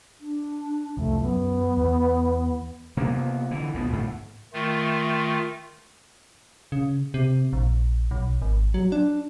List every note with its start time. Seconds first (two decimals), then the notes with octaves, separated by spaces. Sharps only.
0.20 D4
0.97 C2 F2 A3
1.21 F#2 B3
1.77 E2
2.97 C3 A#3 B3
3.51 D3 E3
3.74 C#2 B2 B3
3.92 D2 G#2 A3
4.53 D#3 A3 F4
6.72 C#3
7.14 C3
7.53 A#1
8.11 B1
8.42 G#1
8.74 F#3
8.92 D4